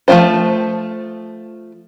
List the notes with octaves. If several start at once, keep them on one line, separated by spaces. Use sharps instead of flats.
F3 A3 E4 F4 C5